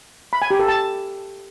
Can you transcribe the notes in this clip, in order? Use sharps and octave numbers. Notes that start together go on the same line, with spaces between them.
B5
G#5
G4
A4
A5